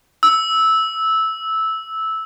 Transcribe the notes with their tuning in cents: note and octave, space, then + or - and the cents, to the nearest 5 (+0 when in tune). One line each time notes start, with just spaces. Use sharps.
E6 -10